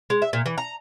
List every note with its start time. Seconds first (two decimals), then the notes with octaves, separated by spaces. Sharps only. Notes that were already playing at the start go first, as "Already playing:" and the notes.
0.10 G#3
0.22 E5
0.33 A#2
0.46 E3
0.58 A#5